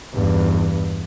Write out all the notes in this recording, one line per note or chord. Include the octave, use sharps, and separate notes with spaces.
E2 G2